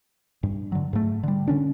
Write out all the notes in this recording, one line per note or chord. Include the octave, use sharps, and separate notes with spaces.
G2
D3 F#3
G#2 A3
D3 G3
D3 C#4 D4